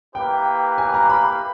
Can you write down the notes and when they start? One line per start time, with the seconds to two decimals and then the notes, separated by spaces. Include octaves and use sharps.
0.15 A#3 E4 G4 B4 G5
0.78 G#5
0.94 A#5
1.10 B5